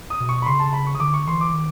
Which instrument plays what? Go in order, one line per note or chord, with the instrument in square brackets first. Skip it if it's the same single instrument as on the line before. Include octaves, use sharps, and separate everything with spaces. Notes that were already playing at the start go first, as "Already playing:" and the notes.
[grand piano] D#6
[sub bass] B2
[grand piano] C#6
B5
[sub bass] C#3 [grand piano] C6
[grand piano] A5
B5
C#6
D#6
[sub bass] D3 [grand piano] D6
[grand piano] C#6
[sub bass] E3 [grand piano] C6
[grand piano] D6
[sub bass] D#3